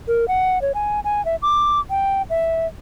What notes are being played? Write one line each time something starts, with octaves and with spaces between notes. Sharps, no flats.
A#4
F#5
C#5
G#5
G#5
E5
D6
G5
E5